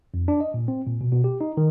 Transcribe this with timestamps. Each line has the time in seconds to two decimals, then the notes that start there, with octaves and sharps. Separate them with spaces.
0.14 F2
0.28 D4
0.40 D#5
0.54 A#2
0.68 C4
0.86 A#2
1.01 B2
1.12 B2
1.24 G4
1.41 D#4
1.57 D#3